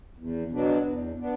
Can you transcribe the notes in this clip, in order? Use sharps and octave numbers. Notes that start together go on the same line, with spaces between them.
E2
B2 F#3 B3 D4
E2
B3 D4